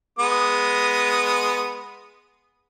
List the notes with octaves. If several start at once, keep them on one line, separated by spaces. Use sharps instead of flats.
G#3 B3 D#6